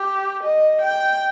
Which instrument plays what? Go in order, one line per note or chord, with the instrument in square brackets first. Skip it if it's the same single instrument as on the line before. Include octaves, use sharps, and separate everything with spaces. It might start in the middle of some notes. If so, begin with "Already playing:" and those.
Already playing: [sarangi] G4
D#5
G5